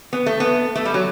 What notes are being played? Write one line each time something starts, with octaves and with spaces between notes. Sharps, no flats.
B3
A3
B3
A3
G3
F#3